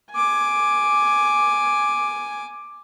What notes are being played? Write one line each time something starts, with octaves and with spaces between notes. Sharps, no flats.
G#5 D6